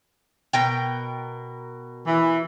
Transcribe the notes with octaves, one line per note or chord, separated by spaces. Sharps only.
B2 A#4 G5
E3